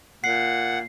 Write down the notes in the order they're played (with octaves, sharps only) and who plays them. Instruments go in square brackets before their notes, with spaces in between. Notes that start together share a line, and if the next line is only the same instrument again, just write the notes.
[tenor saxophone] A#2 [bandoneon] F#5 [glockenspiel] C7